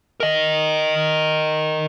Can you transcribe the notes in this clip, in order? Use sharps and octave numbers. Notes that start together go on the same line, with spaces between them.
A#4 D#5